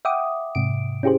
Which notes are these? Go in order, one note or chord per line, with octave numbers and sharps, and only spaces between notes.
E5 F#5 G5 D6 D#6
G#2 C3 D7
C#4 E4 G4 G#4 C5